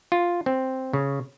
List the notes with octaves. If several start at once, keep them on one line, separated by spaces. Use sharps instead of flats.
F4
C4
C#3